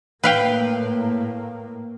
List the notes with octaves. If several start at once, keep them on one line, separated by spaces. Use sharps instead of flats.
A2 A#3 B4 F5 G5